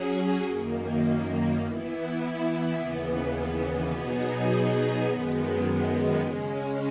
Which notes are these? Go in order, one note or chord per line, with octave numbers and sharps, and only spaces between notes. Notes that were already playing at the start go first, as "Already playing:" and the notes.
Already playing: F#3 C#4 G#4
F#2 D#3 A#3
E3 B3 E4
D#2 C#3 E3 B3
B2 F#3 B3 D#4 G#4
F#2 D#3 G#3 B3
C#3 G#3 C#4